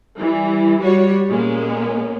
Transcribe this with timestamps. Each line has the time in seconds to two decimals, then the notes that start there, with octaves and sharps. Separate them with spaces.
0.18 E3 G3
0.79 G3 F#4 C#5
1.30 A#2 G#3 A#3 B3 C#4